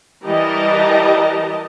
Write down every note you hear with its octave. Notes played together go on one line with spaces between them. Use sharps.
E3 G3 A#4 D#5 A5 A#5